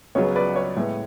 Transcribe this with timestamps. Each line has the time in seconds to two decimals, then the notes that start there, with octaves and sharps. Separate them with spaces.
0.15 C#2 C#3 F#3 B3 C#5
0.36 B4 D5
0.56 C#5
0.76 A2 G#3 B3